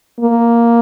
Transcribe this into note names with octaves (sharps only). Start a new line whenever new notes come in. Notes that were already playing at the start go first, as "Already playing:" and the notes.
A#3